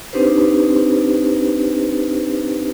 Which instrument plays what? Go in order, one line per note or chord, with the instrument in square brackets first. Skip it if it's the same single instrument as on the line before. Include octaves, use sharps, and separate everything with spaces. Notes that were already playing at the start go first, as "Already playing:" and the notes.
[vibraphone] C4 D4 D#4 G4 B4 C5